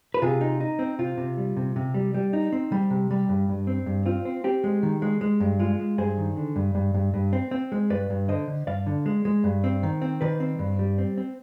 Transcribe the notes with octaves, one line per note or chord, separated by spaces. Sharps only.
B4
C3 F4 G#4
D#4
D#4
C4
C3 F4
C3
G3
C3
C3
G3
G3
D#4
C4
G3
C3
G3
G2
G2
C4
G2
C4 F4
C4
C4 G4
G#3
D#3
G#3
G#3
G2
G#3 F4
G#3
G2 G#4 C5
D#3
D3
G2
G2
G2
G2
C4
C4
G#3
G2 B4 D5
G2
D3 C5 D#5
D3
G2 D5 F5
D3
G#3
G#3
G2
C4
D#3
C4
D#3 B4 D5
C4
G2
G3
C4
C4